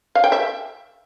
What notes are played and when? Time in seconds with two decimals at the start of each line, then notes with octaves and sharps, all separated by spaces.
0.15 F5
0.24 G5
0.32 E5